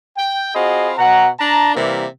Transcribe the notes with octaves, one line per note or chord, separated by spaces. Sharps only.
G5
C4 F4 F#4 G#4 D#5 B5
B2 F#5 A#5
D4 A5 A#5
C3 E3 G3 A#3